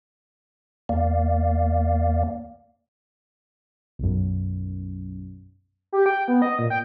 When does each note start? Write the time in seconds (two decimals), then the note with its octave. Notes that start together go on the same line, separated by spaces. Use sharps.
0.89 E2 A#3 D5 F5
3.99 B1 F#2
5.93 G4
6.06 G5
6.28 B3
6.42 D#5
6.59 A#2
6.70 G5